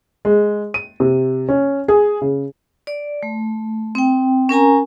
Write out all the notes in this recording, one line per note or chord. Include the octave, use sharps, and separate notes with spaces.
G#3
D#7
C3
C#4
G#4
C#3
D5
A3
C4 G5
C#4 A#4 G#5 A#5